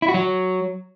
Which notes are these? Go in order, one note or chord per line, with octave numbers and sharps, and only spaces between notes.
E4
F#4
F#3